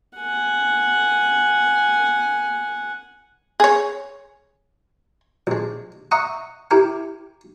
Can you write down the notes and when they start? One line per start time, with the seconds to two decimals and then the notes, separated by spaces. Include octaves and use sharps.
0.18 F#5 G#5
3.60 G#4 C#5
5.47 A#1 G#3
6.11 D#5 E5 F#5 A#5 C#6 D#6
6.71 E4 G4 A#4 G#5